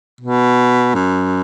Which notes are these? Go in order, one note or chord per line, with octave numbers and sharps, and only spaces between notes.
B2
F#2